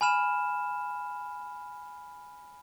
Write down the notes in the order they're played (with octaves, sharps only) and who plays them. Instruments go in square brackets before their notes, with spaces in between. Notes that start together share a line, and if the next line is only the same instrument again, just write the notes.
[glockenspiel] G#5 B5 F6 E7